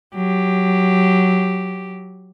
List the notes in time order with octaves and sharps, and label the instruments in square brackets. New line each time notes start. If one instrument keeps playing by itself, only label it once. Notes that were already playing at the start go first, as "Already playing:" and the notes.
[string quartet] F#3 G4